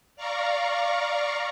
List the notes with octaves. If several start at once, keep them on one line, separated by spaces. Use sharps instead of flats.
D5 F5 A#5 C#6